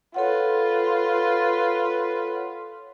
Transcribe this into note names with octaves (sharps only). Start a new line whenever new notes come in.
F4 A4 B4 C#5 F#5